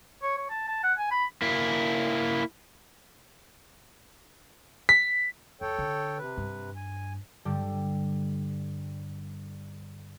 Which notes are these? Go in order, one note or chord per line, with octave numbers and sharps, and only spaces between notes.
C#5
C#5
A5
A5
F#5
G#5
B5
A#3 E4
B6
F2 A4 C#5 G5
D3
C3 B4
G2
G#5
G2 D3 G3 G4